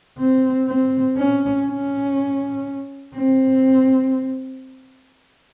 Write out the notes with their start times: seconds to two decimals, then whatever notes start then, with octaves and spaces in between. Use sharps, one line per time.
0.19 C4
0.67 C4
1.17 C#4
1.67 C#4
3.15 C4